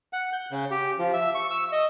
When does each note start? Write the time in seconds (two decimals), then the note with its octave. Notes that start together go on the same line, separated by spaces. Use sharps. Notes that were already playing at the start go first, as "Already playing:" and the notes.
0.13 F#5
0.33 G6
0.51 C#3
0.71 G4
0.99 F3
1.13 E5
1.35 C#6
1.51 E6
1.72 D#5